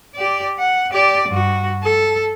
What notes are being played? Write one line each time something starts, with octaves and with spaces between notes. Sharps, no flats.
G4 D5
F#5
G4 D5
G2 F#4
A4